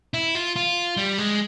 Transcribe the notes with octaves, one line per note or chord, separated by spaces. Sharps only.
E4
F4
F4
G3
G#3